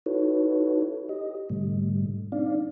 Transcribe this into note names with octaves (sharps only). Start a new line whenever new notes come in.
D#4 E4 F#4 A4 B4 C#5
G4 D#5
G#2 B2 D3 G3 A3
C4 D4 D#4 D5 F5